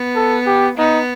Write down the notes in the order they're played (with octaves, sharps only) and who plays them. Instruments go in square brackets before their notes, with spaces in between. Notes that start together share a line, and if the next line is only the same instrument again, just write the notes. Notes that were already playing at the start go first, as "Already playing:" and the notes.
Already playing: [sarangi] B3
[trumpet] A4
G4
[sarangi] B3 [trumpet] D#4